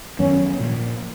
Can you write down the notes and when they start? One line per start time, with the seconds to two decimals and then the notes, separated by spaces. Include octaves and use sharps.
0.19 F#2 D#3 F#3 B3 C#4
0.60 A#2 F3 A#3